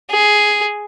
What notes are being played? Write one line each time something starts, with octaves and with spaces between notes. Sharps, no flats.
G#4